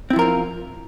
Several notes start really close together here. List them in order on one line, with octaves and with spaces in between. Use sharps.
C4 E4 F3 A#4 F4